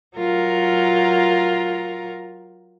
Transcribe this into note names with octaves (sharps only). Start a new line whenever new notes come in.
F#3 F4 A#4